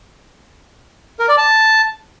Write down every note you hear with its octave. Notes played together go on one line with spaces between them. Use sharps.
A#4
D5
A5